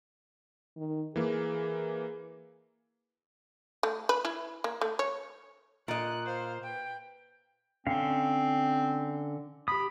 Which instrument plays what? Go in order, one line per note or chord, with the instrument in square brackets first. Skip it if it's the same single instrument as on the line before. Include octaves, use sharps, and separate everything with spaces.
[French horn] D#3
[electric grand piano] E3 A#3 [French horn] G#4
[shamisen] A3
B4
E4
A#3
A3
C#5
[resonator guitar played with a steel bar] A#2 D#5 [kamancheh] F#6
[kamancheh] C5 F5
B4 G5
[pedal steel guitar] D3 C#4 F5 [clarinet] C4
[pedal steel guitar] G4 D#6 [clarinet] B5